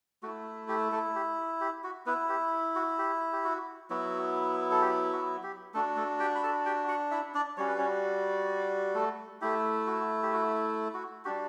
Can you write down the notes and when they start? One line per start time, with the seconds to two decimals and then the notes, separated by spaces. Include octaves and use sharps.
0.23 A3 E4 F#4
0.69 G4
0.92 A3 A4
1.15 G4
1.61 G4
1.84 F#4
2.06 B3 E4 B4
2.29 G4
2.76 F#4
2.98 G4
3.33 G4
3.44 F#4
3.90 F#3 B3 E4 F#4
4.71 A4
4.81 G4
5.13 F#4
5.43 G4
5.74 A3 D4 F#4 A4
5.97 A3 A4
6.20 G4 G5
6.35 B5
6.43 A4 A5
6.66 G4 G5
6.88 F#4 F#5
7.11 E4 E5
7.34 D4 D5
7.57 G3 C#4 F#4 C#5
7.68 B4
7.78 C#4 C#5
8.95 A3 A4
9.41 A3 E4 G4
9.87 F#4
10.23 G4
10.33 F#4
10.94 F#4
11.25 G3 D4 F#4 G4